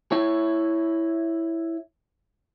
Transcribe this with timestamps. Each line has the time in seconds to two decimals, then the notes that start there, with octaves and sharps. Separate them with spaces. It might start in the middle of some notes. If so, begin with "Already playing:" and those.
0.12 E4 C#5